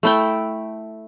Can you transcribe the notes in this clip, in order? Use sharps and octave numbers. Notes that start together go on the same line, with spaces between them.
A3 E4 G5